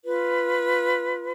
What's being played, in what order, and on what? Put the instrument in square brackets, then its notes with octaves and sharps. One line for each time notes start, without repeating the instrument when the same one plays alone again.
[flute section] F4 B4